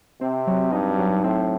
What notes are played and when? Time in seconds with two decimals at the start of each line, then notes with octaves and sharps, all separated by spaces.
0.21 C3 C4
0.47 F#3
0.72 G2 D#4
0.98 F#3
1.24 A2 C4